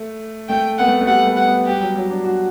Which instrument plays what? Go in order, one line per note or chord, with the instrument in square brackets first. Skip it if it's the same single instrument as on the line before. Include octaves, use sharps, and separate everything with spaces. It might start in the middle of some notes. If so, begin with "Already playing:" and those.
Already playing: [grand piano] A3
[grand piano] A3 [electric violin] G5
[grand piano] B3 [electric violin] F#5
[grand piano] A3
A3
[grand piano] G3 [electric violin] F#5
[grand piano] B3
[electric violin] F#5
[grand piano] B3
[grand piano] G3 [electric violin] G4
[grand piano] F#3
F#3
D4
F#4